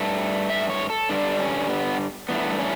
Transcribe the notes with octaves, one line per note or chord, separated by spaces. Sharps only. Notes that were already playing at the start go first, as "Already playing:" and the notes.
Already playing: G2 A3
E5
C#5
A4
G2 D3 G3 D4
C#4
B3
G2 E3 A3 B3
B3
C#4